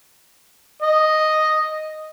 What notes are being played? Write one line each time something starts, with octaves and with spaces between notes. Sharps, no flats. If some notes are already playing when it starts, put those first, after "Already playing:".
D#5